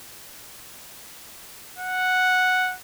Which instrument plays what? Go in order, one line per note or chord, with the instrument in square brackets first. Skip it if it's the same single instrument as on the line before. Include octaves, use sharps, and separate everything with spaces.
[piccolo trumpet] F#5